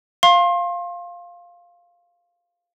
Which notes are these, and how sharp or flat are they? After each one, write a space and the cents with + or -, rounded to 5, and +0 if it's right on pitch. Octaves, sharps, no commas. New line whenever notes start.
F5 +0 C6 +35